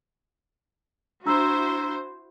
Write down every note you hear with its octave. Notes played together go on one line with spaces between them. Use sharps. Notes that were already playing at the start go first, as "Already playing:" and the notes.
D4 E4 F#4 C5 A#5 E6